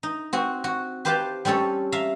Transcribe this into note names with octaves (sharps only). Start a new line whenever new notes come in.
D#4
C4 F#4 G#5
F#4
G4 B4 C5 F5 G5 A5
G3 C4 C#4 A4 C#5
E5 F5 A#5